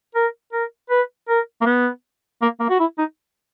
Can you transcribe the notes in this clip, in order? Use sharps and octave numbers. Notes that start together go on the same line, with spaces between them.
A#4
A#4
B4
A#4
A#3
B3
A#3
A#3
F#4
E4
D#4